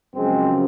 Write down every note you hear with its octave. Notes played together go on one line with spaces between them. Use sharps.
F#2 C#3 F3 G#3 C4